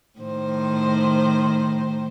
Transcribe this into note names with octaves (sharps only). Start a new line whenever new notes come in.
A2 D#3 C5